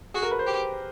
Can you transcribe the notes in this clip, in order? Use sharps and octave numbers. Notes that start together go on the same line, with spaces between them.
F#4 G#4
A#4
B4
C5
G4